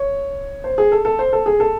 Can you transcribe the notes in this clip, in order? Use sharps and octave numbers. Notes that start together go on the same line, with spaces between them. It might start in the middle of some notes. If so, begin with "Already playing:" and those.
Already playing: C#5
C5
G#4
A4
A4
C5
A4
G#4
A4